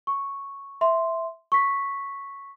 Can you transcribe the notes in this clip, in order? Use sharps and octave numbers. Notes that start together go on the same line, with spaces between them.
C#6
E5 C6
C#6 B6